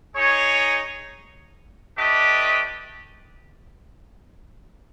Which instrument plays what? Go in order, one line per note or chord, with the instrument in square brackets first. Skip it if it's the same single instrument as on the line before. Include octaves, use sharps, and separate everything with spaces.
[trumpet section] D#4 G#4 C#5
A3 D4 G4 B4 D#5